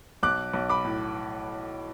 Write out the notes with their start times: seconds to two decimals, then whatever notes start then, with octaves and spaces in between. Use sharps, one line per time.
0.23 B1 D6 F#6
0.54 B1
0.69 B5 D6
0.85 A2